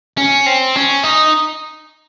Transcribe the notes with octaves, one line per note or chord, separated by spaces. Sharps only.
C#4
C4
C#4
D#4